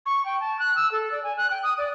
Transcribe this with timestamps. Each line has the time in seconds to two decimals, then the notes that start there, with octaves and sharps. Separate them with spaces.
0.06 C#6
0.25 G5
0.40 A5
0.59 F#6
0.76 E6
0.91 A4
1.11 D5
1.23 G#5
1.37 F#6
1.51 G5
1.63 D#6
1.78 D5